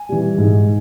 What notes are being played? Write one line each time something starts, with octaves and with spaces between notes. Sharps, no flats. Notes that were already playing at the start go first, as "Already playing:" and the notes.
Already playing: G#5
E3 G3
G#2